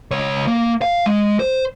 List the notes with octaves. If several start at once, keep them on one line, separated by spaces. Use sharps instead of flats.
C#2 C#5
A#3
F5
G#3
C5